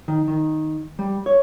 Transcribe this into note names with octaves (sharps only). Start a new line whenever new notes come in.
D#3
D#3
G3
C#5